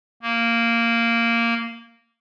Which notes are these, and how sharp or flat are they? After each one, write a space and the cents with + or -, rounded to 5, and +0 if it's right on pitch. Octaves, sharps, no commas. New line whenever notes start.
A#3 -10